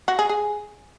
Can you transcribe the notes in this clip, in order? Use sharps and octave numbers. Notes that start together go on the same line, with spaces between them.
F#4
G#4
G#4